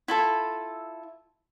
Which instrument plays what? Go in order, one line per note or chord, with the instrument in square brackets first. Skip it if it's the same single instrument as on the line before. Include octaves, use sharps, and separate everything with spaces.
[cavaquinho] E4 F4 A4